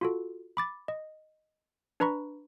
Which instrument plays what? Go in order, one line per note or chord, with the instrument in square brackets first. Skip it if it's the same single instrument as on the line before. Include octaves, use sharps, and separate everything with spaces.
[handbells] F4 F#4 A4
B5 D6 A6
D#5
D4 B4 A#5 B5 C#6